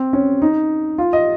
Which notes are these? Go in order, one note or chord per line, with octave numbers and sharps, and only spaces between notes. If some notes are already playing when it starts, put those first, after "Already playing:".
Already playing: C4
C#4
D#4
F4
D#5